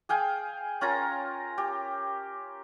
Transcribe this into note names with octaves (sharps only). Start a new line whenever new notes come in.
G#4 F5 G5 G#5
C#4 F4 A#4 A#5
G4